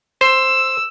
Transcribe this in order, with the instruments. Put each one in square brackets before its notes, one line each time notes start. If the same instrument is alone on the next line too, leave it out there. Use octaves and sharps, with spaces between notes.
[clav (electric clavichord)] C5 [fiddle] E6